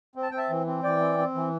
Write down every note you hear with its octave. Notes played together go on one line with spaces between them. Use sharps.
C4
A5
C4 G5
E5 A5
E3
C4
E3 D5 G5
C4
C4
E3